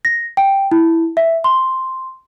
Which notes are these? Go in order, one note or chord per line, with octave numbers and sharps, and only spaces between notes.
A#6
G5
E4
E5
C6